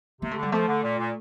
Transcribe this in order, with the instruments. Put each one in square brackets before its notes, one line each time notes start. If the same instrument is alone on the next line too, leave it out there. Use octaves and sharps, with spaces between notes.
[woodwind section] C3 [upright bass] A#3
[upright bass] A3
[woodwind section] D3
[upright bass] G3
[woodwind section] F3 [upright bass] A3
[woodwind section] D3
A#2
A#2